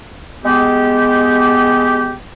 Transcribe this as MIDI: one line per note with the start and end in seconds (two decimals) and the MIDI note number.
0.45 2.14 56
0.45 2.14 59
0.45 2.14 67